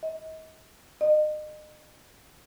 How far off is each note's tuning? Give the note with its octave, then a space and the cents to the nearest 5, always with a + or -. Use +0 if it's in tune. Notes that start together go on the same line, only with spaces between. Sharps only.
D#5 +35
D#5 -35